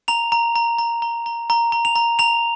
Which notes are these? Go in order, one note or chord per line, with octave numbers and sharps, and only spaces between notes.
A#5 F7
A#5
A#5
A#5
A#5
A#5
A#5
A#5
F7
A#5
A#5 F7